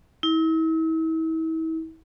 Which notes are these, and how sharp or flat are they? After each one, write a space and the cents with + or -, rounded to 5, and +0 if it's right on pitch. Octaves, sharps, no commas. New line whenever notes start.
E4 -40